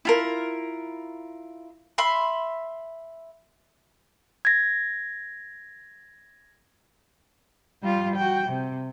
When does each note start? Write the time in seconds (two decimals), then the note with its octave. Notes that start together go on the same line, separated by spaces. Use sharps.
0.05 E4 F4 A#4
1.98 E5 B5 C6
4.45 G#6 A#6
7.83 G3 F4
8.16 F#4 G5
8.47 C3